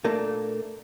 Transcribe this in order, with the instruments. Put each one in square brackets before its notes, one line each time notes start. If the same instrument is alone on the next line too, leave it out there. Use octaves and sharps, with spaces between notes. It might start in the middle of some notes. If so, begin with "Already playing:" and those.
[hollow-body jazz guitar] A#2 A3 A#3 D4